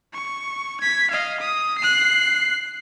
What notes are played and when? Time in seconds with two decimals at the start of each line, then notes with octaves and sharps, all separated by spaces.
0.14 C#6
0.80 G#6 B6
1.11 D#5 F5
1.40 D#6
1.78 F#6 C7